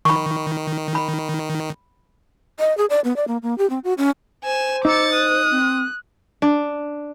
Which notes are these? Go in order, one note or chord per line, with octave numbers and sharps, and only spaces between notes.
D#3 B5 C#6
B5
D#5
G#4
D5
B3
D5
A#3
A#3
G4
C4
F#4
C#4
C5 G#5 E7
D#4 D6 E6 A6 C#7
D#6 F#6
C4
D4